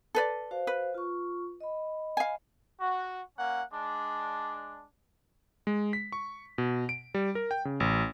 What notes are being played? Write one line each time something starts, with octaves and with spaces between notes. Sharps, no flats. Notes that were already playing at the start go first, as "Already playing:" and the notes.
A4 B4 D5
F#4 C5 F5
B4
F4 C#6
D#5 B5
F5 G#5
F#4
A#3 C#4 F#5
G#3 D4
G#3
B6
C#6
B2
D7
G3
A#4
G5
C#3
A1